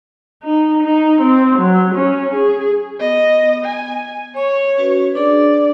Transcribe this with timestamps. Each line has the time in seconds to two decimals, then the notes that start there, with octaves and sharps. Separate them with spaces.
0.43 D#4
0.82 D#4
1.21 C4
1.58 F#3
1.95 C#4
2.34 G#4
3.00 B3 D#5
3.65 G#5
4.37 C#5 C#6
4.78 C#4 F#4 B4
5.15 D4 G#4 D5